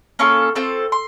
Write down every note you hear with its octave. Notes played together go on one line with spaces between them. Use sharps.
A#3 C#4 F4 A4 C#6
C4 F4 A4
C6